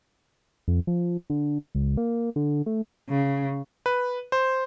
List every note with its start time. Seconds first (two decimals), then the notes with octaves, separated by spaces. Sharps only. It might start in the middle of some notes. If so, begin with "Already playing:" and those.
0.68 F2
0.87 F3
1.30 D3
1.75 C#2
1.97 A#3
2.36 D3
2.66 A3
3.10 C#3
3.86 B4
4.32 C5